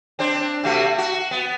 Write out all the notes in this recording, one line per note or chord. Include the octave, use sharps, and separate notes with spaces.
C4 D4 C5
C3 A3 F#4
F#4
B3